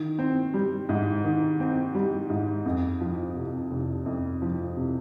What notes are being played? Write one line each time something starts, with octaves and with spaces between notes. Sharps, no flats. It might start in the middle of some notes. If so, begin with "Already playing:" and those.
Already playing: D#3
C4
G3
G#2
D#3
C4
G3
G#2
F2
F3
C3
F1
F2
F3
C3